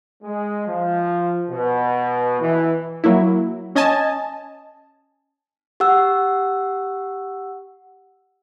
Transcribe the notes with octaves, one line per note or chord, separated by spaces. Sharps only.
G#3
F3
B2
E3
F#3 A#3 E4
C#4 D#5 G#5 A5
G4 F#5 E6